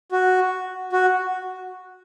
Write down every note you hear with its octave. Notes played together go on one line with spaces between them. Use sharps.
F#4
F#4